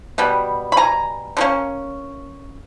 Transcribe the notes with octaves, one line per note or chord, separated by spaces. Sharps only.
B2 G3 B3
B5
G#5 A#5
D3 F#3 A#3 C#4